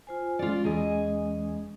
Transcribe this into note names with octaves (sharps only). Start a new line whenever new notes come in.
F4 C5 G#5
G#3 C#4 F4 D5
E2 G#4 D#5